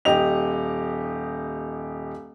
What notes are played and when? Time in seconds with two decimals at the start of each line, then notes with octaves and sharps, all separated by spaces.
0.05 D#1 G4 D#5 F7